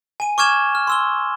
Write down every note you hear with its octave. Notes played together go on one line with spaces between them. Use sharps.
G#5 D#7
C#6 D6 F6 G#6 E7 G7
F6
C6 E6 G7